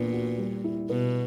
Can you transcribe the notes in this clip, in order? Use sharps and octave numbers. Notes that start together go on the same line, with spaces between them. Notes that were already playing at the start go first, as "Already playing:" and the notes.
Already playing: A#2 E3 B3 D4
F#4
G3
E4
B2 B3